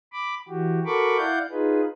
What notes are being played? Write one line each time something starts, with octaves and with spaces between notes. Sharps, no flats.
B5 D6
E3 F#4 G4
F#4 A4 A#4 B5 C#6 D6
E4 D5 F5 F#5 G6
D#4 F4 G#4 B4